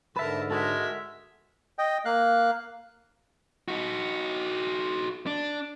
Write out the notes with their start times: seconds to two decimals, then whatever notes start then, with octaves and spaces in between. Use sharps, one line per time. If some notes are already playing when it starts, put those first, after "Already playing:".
0.16 G#2 D3 A#4 B4 E5 A5
0.51 G#3 F#4 A4 A#4 E5
1.79 D#5 G5
2.05 A#3 F5 F#6
3.68 D#4 F#4
5.27 D4